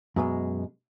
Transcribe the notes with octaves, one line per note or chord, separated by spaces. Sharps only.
F#2 B2 G#3